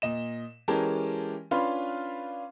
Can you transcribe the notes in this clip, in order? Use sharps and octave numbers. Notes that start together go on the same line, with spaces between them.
A#2 D#5 E7
E3 G#3 C#4 G4 A#4 A5
C#4 D4 F4 B4 F5 C6